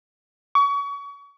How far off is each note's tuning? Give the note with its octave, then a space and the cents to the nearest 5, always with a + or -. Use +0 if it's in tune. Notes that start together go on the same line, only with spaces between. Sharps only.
C#6 +30